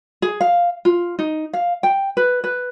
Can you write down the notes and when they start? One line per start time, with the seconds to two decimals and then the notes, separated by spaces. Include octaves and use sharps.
0.22 G#4
0.41 F5
0.85 F4
1.19 D#4
1.53 F5
1.83 G5
2.17 B4
2.44 B4